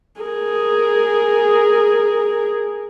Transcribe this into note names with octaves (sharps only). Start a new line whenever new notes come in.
G#4 A#4